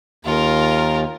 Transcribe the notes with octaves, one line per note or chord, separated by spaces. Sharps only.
D#2 F4 A#4